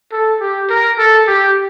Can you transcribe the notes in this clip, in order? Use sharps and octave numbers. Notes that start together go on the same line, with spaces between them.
A4
G4
A#4
A4
G4